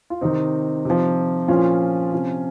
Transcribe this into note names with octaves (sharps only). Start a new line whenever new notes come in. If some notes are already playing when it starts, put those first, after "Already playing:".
F4
C3 D#3 C4 D#4
C3 F3
A#2 F3 C#4 F4
C3 F3